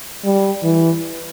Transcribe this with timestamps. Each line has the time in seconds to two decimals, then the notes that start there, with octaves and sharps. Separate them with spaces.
0.24 G3
0.63 E3